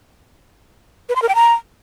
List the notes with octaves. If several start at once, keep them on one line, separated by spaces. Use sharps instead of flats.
B4
C6
A#4
G5
A#5